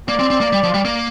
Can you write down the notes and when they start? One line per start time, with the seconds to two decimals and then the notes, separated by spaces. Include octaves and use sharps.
0.08 A#3 D5
0.20 C4
0.30 C4
0.41 A#3
0.53 G3
0.63 F3
0.74 G3
0.85 A#3